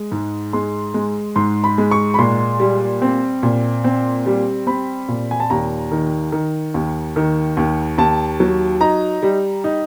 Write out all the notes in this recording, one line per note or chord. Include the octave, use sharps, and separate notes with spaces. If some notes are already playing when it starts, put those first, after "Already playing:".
Already playing: G#3
G#2
G#3 C6
G#3
G#2 C6
B5
G#3
C#6
B5
A#2 C6
G3
C4
A#2
C4
G3
C4 B5
A#2
G#5
A5
D#2 A#5
D#3
D#3
D#2
D#3
D#2
D#2 A5
F#3
D#4 A#5
G3
D#4